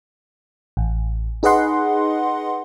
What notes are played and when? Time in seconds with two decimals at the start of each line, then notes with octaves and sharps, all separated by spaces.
0.77 A1
1.43 D#4 G#4 B4 D#5 F#5 C6